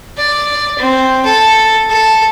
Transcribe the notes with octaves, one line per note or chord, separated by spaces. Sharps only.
D5
C4
A4
A4